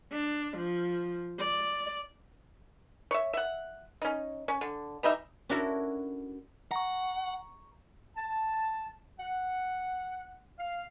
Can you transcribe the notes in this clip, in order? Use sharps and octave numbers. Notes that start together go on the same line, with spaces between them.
D4
F3
D5
C#5 E5
E5 F#5
C#4 D#4
C#4
D3
E3 G3 D#4 E5
C#4 D4 E4 F#4 A4 A#4
F#5 A#5 C#6
A5
F#5
F5